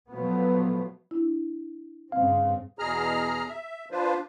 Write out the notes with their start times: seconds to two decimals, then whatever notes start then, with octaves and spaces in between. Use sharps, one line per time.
0.12 B2 F3 F#3 A3 B3
1.11 D4 E4
2.12 G2 C#3 C4 F5
2.79 E2 B2 G#4 A#5 F6
3.48 E5
3.91 F3 D4 F4 B4 C5